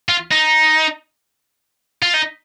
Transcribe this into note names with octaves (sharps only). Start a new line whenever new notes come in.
F4
D#4
F4
D#4